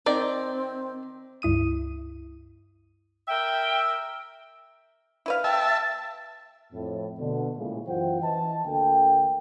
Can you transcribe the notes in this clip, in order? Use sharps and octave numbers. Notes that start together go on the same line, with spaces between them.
D#3 C4 D5
C#2 G2 E4 D#6 D#7
A#4 E5 G5
E4 B4 F5
E5 G5 A5
A6
F2 A2
B2 D3
A#1 A2 C#3 G#3
F#2 E3 F4 C5 F#5 G5
E3 D#5 A5
D2 D3 A#3 A4 G5